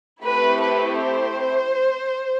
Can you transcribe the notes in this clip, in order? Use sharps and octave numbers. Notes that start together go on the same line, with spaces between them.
A3 C4 E4 G4 B4
B4
C5